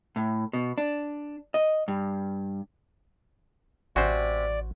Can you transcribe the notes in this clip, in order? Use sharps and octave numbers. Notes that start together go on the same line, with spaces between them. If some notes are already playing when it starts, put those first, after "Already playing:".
A2
B2
D4
D#5
G2
A1 C3 F#4 C5 D5 G#5